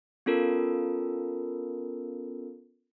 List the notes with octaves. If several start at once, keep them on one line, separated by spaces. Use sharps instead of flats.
B3 C#4 F4 A4 A#4